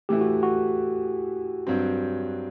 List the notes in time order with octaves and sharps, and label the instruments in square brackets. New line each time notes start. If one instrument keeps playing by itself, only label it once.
[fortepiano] A2 E3 A3 E4 [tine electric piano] G4
[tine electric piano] F#4
F#4
[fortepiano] G2 F#3 C4